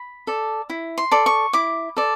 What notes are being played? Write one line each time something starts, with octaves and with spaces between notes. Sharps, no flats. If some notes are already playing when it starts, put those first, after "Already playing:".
Already playing: B5
A4 D5
E4
C6
A4 D5
C#6
E4 D6
A4 D5